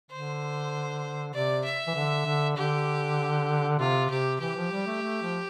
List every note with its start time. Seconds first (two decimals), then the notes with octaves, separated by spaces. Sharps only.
0.11 D3 C5
1.33 C3 D5
1.64 E5
1.87 E3
1.95 D3
2.26 D3
2.56 D3 G4
3.79 C3 F4
4.10 C3 G4
4.40 E3 G4
4.56 F3
4.71 G3
4.87 A3
5.02 A3
5.22 F3